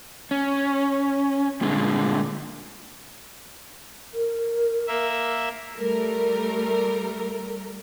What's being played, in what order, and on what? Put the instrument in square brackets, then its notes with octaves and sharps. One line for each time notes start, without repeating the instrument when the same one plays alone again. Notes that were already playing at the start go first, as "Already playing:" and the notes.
[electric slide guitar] C#4
G2 A#2 D3 G#3
[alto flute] A#4
[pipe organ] A#3 E5
[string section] G3 A3 A#4